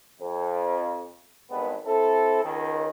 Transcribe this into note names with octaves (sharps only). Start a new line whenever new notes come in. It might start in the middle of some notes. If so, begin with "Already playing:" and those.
F2
G#1 G2 G#3 B3 B4
C4 E4 A4
C#2 D#3